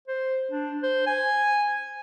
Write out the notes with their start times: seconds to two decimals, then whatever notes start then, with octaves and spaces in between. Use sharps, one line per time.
0.08 C5
0.51 D4
0.83 C5
1.07 G#5